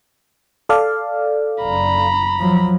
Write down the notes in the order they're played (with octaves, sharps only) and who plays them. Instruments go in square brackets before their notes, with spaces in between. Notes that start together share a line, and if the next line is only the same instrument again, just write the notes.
[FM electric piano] A4 D5 F5
[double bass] F#1 [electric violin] A#5 B5
[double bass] F3 F#3